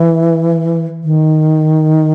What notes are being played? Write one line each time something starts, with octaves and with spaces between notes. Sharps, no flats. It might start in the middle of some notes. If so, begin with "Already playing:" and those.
Already playing: E3
D#3